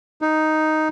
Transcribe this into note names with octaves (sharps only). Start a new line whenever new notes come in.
D#4